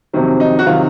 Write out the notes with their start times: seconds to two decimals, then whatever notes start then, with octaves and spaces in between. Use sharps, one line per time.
0.13 F2 C3 D#3 F#3
0.40 D#4
0.59 F#4
0.66 C3 D#3 F#3 F4